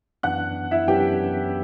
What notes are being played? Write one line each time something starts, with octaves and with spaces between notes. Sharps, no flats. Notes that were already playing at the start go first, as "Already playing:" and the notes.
F#2 E3 B3 D4 F#5 F#6
E4 E5
F#2 E3 B3 D4 G4 G5